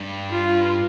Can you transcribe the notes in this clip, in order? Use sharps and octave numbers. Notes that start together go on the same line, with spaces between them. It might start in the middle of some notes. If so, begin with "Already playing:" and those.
Already playing: G2
F4